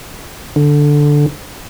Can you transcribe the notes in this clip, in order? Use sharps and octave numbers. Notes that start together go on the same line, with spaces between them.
D3